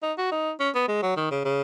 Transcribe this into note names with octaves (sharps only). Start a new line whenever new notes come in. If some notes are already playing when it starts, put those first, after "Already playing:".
D#4
F#4
D#4
C#4
B3
G#3
F#3
D#3
C#3
C#3